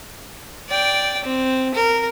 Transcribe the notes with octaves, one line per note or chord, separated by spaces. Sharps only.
D5 G5
C4
A#4